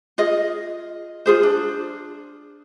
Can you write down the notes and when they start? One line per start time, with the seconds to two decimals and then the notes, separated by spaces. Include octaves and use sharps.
0.18 F4 G#4 D#5
1.26 F4 G#4 C5
1.43 D4